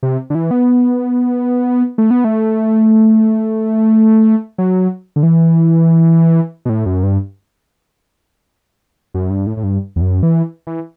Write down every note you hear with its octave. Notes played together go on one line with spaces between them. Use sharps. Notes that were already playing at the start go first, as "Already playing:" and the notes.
C3
D3
E3
B3
A3
B3
A3
F#3
D3
E3
B2
A2
F#2
G2
F#2
G2
A2
A2
G2
E2
F#2
E3
E3